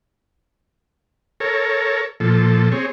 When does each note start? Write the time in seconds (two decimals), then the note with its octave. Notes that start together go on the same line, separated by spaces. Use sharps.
1.40 A4 A#4 C#5
2.20 A#2 F3 A4
2.72 C4 G#4 C#5